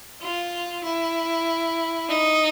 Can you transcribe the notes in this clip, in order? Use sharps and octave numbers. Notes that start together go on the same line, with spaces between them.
F4
E4
D#4